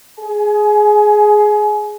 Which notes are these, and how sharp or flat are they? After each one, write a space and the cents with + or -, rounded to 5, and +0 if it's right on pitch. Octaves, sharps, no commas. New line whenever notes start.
G#4 +10 G#5 +30